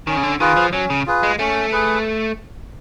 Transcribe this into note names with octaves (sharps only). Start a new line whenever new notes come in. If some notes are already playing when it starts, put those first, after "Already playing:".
D#3 C#4
C#3
D3
D#3 F4 G#4 B4
F3
F#3 C#4
C#3
F4 G#4 B4
G#3
A3 C#4
G#4 B4